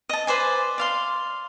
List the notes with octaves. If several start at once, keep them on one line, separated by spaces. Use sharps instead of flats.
D#5 A5
B4 C5 D5 G#5
D5 F5 C6